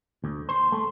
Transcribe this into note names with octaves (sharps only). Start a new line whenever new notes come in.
D2
C5
A3